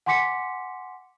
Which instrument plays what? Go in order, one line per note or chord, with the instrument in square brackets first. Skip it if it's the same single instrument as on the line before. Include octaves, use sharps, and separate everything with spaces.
[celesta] F#5 G#5 C6 D6 B6 C#7